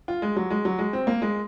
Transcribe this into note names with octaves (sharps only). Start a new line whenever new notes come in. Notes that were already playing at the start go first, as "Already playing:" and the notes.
F4
G#3
F#3
G#3
F#3
G#3
C4
A#3
G#3